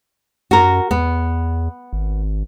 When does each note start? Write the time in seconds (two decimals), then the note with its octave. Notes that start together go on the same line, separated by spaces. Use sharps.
0.51 F#2 F#4 A#4
0.91 E2 B3
1.93 G#1